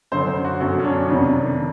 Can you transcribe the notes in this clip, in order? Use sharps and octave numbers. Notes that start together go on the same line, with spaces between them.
F#2 D3 F#3 C5
C5
F#4
F#2 D3 F#3 F#4
C#4
D4
F2 C3 D#3
C3